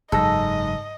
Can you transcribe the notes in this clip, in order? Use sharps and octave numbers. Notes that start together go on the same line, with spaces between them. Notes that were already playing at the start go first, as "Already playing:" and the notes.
F#1 G#2 F#3 A4 D#5 A#6